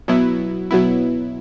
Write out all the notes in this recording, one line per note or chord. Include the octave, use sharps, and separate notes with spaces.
B2 F#3 B3 E4
B2 F#3 B3 E4